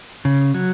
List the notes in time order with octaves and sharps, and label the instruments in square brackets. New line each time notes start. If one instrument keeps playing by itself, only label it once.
[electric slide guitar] C#3
F#3